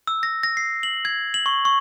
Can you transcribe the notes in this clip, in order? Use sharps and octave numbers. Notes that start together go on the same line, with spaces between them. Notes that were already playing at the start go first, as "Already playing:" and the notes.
E6
A#6
A#6
C7
F#7
G#6
F#7
C#6
C#6